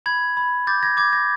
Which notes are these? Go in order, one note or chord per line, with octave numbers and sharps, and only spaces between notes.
B5 G#6
B5
D6 G6 A6
G#6 A#6
D6 G#6
G#6 A#6